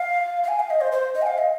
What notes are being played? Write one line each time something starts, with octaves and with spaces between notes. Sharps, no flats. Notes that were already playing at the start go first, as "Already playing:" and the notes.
Already playing: F5
F5
G#5
F5
D#5
C5
C5
D#5
G#5
F5
D#5